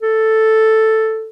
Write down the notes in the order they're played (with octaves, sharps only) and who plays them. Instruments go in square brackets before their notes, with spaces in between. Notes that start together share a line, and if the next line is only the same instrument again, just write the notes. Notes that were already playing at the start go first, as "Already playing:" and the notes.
[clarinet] A4